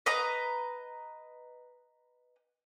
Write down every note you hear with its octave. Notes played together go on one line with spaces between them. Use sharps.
B4 D#5 A#5